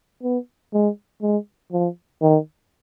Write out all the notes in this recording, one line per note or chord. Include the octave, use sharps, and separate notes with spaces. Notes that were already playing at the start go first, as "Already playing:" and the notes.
B3
G#3
G#3
F3
D#3